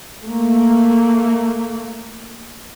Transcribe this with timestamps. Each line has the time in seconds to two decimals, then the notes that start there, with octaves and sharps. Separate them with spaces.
0.24 A3 A#3